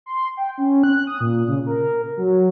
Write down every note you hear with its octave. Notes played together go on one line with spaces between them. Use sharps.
C6
G5
C#4
F#6
D#6
A#2
C#3
A#4
F#3